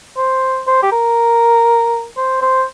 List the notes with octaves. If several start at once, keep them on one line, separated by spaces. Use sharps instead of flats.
C5
C5
G4
A#4
C5
C5